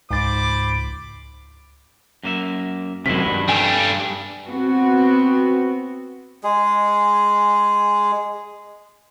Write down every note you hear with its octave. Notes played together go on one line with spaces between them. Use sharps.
C#2 G#2 C5 B5 D6 A6
F#2 A#3 E5
F#2 C3 D#3 G#3 E4 B6
G2
G3 A3 D4 G5 G#5
B3 C4 F#4
G#3 G#4